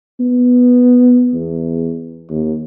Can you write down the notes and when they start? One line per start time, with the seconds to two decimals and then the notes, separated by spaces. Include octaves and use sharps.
0.20 B3
1.33 E2
2.30 D#2